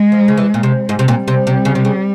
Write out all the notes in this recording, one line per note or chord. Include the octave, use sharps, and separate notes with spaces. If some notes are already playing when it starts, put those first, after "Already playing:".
Already playing: G#3
F3
C#3
E3
A#2
C3
G#2 G3
C3
A#2
C3
C3
C#3
C3
C#3